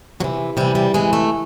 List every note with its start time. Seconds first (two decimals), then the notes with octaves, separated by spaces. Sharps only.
0.20 C3 F#3
0.24 E3
0.57 C3 E3 G3
0.75 G3
0.94 C3 E3 G#3
1.13 A3